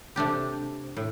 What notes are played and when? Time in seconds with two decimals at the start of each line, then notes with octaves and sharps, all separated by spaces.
0.16 C3 A3 D4 G4
0.97 A2